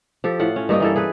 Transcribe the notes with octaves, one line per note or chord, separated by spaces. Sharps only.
F3 G4 A4
A2 F4 F#5
C#4
G2 A#3 D#4 D#5
E3 A#3 A4
G#4 A4 B4